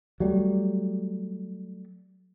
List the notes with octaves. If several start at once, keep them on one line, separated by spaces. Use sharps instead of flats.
F#3 G3 A3